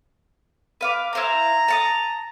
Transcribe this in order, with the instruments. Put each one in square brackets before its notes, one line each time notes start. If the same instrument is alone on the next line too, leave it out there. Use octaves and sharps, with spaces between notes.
[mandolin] B4 F5 D6
[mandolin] E4 C5 F5 [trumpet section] A#5
[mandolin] A5 C#6 D#6